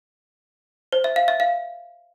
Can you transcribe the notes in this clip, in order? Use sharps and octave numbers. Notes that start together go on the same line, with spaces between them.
C5
E5
F5
E5
F5